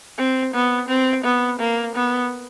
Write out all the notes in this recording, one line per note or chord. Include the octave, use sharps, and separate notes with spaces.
C4
B3
C4
B3
A#3
B3